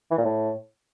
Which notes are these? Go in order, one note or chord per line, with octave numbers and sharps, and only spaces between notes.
E3
A#2
A2